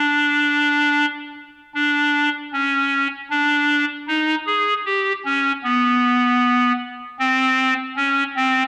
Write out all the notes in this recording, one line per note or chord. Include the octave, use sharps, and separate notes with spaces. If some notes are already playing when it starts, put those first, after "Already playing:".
Already playing: D4
D4
C#4
D4
D#4
G#4
G4
C#4
B3
C4
C#4
C4